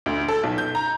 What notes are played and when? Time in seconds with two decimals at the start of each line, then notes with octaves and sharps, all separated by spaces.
0.06 D2
0.28 A4
0.43 B1
0.58 G6
0.75 A#5